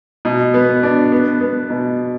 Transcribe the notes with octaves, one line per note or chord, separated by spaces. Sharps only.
B2
B3
D4
B3
B3
B2